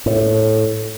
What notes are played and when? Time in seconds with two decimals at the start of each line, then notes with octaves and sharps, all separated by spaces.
0.06 A2